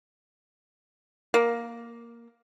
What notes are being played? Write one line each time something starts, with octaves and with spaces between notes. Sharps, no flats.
A#3